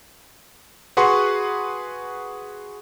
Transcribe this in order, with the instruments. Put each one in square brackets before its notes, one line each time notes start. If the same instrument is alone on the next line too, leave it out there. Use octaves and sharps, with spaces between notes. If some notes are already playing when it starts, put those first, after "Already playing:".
[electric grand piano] F#4 G#4 B4 F#5 C6 C#6